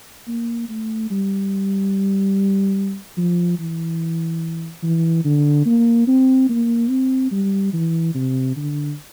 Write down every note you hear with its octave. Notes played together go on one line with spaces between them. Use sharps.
A#3
A3
G3
F3
E3
E3
D3
A#3
C4
A#3
C4
G3
E3
C3
D3